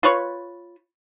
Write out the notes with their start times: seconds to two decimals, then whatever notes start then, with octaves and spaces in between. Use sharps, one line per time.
0.03 F4 B4 C#5